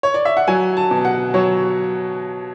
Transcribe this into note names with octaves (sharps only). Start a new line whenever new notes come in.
C#5
D5
E5
F#5
F#3 G#5
A5
B2
F#5
F#3 C#5